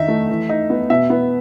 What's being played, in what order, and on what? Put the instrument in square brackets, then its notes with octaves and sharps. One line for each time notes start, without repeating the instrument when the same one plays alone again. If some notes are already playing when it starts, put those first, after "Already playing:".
Already playing: [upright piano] D#3 D#4 E5
A3
E3
D#4
B3
B2 E5
B3